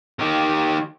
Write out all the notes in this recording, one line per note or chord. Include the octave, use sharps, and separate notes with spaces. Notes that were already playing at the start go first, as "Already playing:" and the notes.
D#3 G4